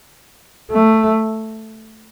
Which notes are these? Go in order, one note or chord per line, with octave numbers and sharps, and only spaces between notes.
A3